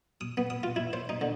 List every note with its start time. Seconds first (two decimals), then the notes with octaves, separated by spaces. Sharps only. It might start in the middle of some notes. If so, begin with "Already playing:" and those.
0.21 D#6
0.37 B3
0.50 D#6
0.63 F4
0.76 E4
0.93 C5
1.09 D#4
1.21 D3